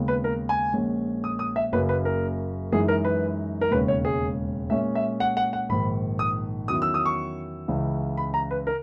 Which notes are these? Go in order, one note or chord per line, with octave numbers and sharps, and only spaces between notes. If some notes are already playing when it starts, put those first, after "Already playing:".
Already playing: D#2 C#3 G#3 B3
B4
A#4
G#5
A#1 A#2 G#3 C#4
D#6
D#6
E5
F#1 F#2 C#3 F#3 A#3 B4
B4
A#4
F#2 E3 G#3 D#4 G#4
A#4
B4
A#4
E1 D#2 C#3 G#3 C#4 B4
C#5
G#4
A#2 G#3 C#4 E5
E5
F#5
F#5
F#5
A#1 G#2 D#3 B5
D#6
E2 D#3 F#3 C#4 E4 D#6
E6
D#6
C#6
C#2 C#3 E3
B5
A#5
B4
A#4